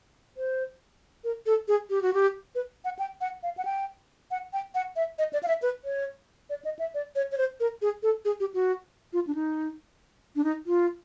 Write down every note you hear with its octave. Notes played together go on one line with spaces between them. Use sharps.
C5
A#4
A4
G#4
G4
F#4
G4
B4
F#5
G5
F#5
F5
F#5
G5
F#5
G5
F#5
E5
D#5
D5
F5
E5
B4
C#5
D5
D#5
E5
D5
C#5
C#5
C5
A#4
G#4
A4
G#4
G4
F#4
F4
D4
D#4
D4
D#4
F4